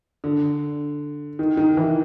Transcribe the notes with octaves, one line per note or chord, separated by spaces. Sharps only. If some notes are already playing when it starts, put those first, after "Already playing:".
D3
D#3
D#3
E3